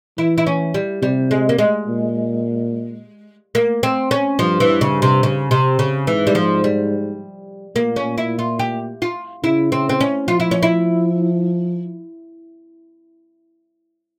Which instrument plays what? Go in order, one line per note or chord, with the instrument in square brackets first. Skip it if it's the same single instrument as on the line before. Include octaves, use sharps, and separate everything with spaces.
[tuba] E3 [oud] E4
[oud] E4
C#4
G3
[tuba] C3 [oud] G3
[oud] G#3
A#3
G#3
[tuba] A#2
[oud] A#3
C4
C#4
[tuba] G2 [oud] F3
[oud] E3
C#3
C3
C#3
C3
C#3
[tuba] G#2 [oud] E3
[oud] G3
F3
G3
[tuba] A#2 [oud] A#3
[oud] C#4
E4
F4
G4
F4
[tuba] C#3 [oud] E4
[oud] C4
C4
C#4
[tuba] F3 [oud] F4
[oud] E4
C#4
E4